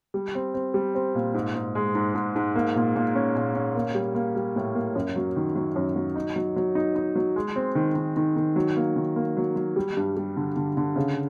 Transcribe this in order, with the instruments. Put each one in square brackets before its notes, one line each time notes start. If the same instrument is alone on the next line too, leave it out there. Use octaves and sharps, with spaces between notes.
[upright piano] G3
C4
C4
G3
C4
A#2
G#2
G#2
G#3
G#2
G#2
G#2
A#3
A#2
A#2
C#4
A#2
C#4
A#3
G3
A#3
G3
A2
A#3
F#2
F#3
D#3
F#3
F#2
F#3
D#4
F#3
F#3
D#4
D#4
F#3
G#3
C4
D#3
D#3
D#3
D#3
F#3
A#3
D#3
A#3
F#3
F#3
G3
G2
G3
D3
D3
D3
C#3